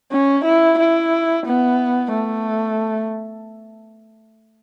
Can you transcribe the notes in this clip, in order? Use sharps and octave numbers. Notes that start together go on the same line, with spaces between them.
C#4
E4
E4
B3
A3